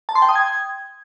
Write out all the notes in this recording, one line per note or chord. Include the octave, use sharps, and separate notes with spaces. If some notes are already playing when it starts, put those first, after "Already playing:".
A5
C6
G5
D#6
G#6